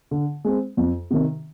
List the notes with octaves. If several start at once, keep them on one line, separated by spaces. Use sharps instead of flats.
D3
G#3 C4
F2
C3 D#3